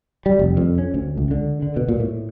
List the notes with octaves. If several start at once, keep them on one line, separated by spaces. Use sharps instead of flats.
G3
F1
F2
C#4
D2
C#2
D3
D3
B2
A#2
A2